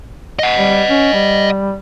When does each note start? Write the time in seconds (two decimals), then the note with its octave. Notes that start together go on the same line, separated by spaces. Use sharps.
0.39 D#5 F#5
0.58 G3
0.90 C#4
1.13 G3